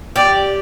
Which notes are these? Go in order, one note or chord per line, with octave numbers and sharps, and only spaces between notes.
G4 D5